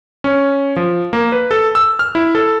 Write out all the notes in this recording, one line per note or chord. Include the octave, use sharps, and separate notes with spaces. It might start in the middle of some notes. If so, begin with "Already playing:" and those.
C#4
F3
A#3
B4
A4
E6
F6
E4
A4